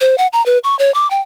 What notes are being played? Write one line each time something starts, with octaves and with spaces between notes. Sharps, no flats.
C5
F#5
A#5
B4
C#6
C#5
D6
G5